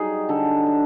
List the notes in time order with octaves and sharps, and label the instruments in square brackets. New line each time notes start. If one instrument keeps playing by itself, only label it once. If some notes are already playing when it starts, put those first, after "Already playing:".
Already playing: [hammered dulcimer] F#3 G3 D#4 G#4
D3 A4
D4